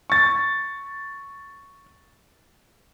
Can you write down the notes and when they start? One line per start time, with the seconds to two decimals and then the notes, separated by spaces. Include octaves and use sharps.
0.10 C#6 A6